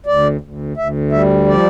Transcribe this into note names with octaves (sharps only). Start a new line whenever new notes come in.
D2 D5
D2
D2 E5
G3 E5
F3 D5